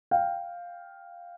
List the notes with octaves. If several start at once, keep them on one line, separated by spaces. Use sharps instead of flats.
F5 G5